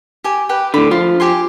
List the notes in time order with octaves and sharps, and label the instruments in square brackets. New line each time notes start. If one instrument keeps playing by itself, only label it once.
[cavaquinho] G4 G#5
G4 B4 G5
[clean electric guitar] A2 D3 [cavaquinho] B5
[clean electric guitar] F3 [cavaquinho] F4
[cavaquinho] G4 G#5 C6